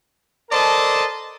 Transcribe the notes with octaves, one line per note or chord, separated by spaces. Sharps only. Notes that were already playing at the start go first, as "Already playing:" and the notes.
A4 A#4 C5 D5 D#5 A5